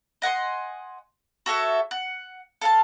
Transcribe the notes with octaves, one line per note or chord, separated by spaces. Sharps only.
D#5 F#5 G#5 C6
F#4 A4 C#5 E5
F#5
A4 F5 A5